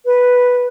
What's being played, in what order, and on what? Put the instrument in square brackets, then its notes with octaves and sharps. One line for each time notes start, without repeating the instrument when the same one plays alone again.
[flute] B4